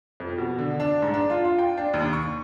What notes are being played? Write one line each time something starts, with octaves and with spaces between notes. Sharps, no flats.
F2
B2
D3
D4
G#2
D4
F4
F4
G5
D4
D#2
C#6